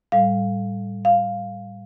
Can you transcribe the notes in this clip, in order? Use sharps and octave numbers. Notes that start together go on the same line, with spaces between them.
A2 G3 F5
F5